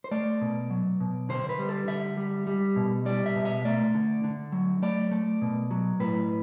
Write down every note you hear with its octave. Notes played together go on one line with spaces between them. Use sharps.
C5
A3 D5
B2
F#3
B2
D3 C5
B4
G3
A4
D3 E5
G3
G3
B2
G3 D5
E5
B2
E5
A3 D5
D3
D3
F#3
A3 D5
A3
B2
F#3
A2 B4